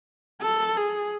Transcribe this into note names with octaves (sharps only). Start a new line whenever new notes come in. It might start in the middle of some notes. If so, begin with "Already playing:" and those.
A4
G#4